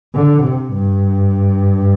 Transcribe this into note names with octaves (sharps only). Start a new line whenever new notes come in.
D3
C3
G2